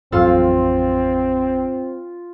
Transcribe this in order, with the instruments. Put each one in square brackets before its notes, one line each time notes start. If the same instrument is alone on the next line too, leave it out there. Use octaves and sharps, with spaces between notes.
[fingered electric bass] A1 F2 F#3 [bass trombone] C4 [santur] F4 [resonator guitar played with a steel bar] A4 F5